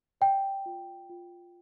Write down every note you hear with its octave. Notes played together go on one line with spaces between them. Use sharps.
D5 G5
F4
F4